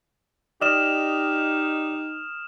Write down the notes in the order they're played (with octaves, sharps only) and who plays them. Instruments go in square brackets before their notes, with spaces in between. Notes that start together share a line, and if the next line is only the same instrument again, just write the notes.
[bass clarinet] D#4 [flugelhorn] G4 [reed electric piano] D5 D#5 [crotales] D#6 F6 E7